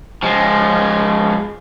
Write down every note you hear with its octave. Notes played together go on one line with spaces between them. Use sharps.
F3 G#3